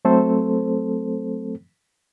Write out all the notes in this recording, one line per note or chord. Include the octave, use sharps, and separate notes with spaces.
F#3 A3 C4 A4 C5